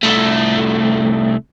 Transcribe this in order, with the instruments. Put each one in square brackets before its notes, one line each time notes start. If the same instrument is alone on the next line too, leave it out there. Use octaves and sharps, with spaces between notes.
[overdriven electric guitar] C2 A3